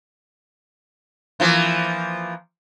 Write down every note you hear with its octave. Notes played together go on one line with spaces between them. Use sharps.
E3 F3 A#3